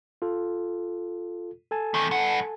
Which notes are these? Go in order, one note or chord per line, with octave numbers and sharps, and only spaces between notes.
F4 A4
A4 G#5 A5
E2 D#3
G2 F#5